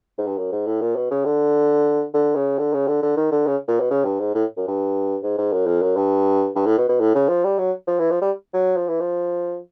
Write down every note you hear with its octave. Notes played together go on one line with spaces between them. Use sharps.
G#2
G2
F#2
G#2
A2
A#2
B2
C#3
D3
D3
C#3
D3
C#3
D3
D3
D#3
D3
C#3
A#2
B2
C#3
G2
G#2
A2
F#2
G2
G#2
G#2
F#2
F2
F#2
G2
G2
A2
B2
B2
A2
C#3
F3
G3
F#3
F3
E3
F3
G3
F#3
F3
E3
F3